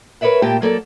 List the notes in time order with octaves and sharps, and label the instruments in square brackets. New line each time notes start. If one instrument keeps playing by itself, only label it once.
[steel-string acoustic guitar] A#4 B4 C#5 D5 E5 F#5
A#2 A#3 G4 G5 A5
F#3 A#3 A4 D5